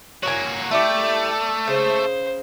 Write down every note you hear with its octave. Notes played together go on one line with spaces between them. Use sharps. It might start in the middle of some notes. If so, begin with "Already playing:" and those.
A#3 F#4 C#5 G#5
A3 E4 G4 D5
C#3 C5